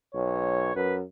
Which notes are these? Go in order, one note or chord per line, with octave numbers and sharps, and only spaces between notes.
B1 C#5
F#2 B4